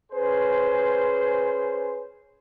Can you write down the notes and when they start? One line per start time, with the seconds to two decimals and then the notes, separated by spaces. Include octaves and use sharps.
0.12 C#4 G#4 B4 C5